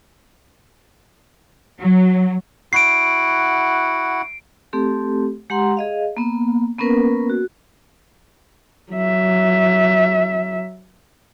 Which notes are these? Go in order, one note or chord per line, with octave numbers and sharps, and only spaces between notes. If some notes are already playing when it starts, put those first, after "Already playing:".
F#3
E4 F#4 F#5 C7 D7
A3 C4 G4 A4
G#3 G4 F#5 A#5 C6
G#4 D#5 F5
A#3 B3
A#3 B3 C#4 A#4 B4
F#4
F#3 E5